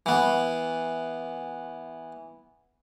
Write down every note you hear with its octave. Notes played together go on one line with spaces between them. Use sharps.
E3 B3